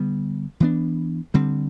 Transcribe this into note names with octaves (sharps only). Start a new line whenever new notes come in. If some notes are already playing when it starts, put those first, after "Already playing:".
Already playing: D3 G3 B3
E3 B3 D4
D3 G3 C4